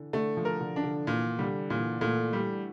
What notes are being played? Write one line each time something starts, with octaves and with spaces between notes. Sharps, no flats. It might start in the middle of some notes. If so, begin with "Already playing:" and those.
Already playing: D3 E3
D3 A3
F3
A#4
D3
D4
D3
A#2 E3
D3 G3
A#2 E3
A#2 A3
G3